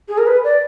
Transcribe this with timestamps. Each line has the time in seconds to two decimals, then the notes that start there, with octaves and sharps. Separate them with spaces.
0.09 G#4
0.18 A#4
0.27 B4
0.44 D5